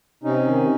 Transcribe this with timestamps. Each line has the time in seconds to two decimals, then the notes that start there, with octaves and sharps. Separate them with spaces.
0.24 C3 C#4 D#4
0.47 D#3